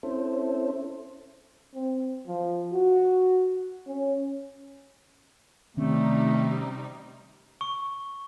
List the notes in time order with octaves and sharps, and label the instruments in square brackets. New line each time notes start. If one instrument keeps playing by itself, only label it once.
[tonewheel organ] C4 C#4 E4 A4 C5
[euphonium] C4
F3
F#4
C#4
[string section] C3 G3 D#4 [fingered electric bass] D#3 C4 C#4 [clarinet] A3
[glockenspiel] C#6